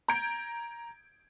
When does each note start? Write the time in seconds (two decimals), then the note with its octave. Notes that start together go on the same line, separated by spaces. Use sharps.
0.08 A#5 G6 G#6 D7